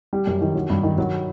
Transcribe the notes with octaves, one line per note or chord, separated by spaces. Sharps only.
G3
F#2
D#3
F#3
G2
D#3
F#3